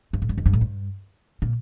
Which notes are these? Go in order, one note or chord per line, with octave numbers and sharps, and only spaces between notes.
G2
A2
G2
F2
G2
A2
G2
A#2